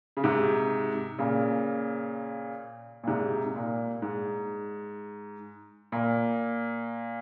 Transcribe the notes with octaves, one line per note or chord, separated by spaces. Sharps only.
C#3
G#2 C3
A#2 C#3
A#2
G#2 C3
A#2
G#2
A#2